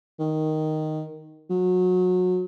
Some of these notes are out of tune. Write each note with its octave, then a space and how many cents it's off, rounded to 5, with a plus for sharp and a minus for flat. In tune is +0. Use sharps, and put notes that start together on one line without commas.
D#3 +0
F#3 -25